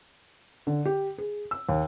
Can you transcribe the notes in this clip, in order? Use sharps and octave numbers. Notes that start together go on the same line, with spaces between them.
D3
G4
G#4
E6
D#2